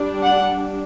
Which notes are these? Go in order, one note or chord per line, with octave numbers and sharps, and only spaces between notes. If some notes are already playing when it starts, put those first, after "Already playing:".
Already playing: G3 D4
F#5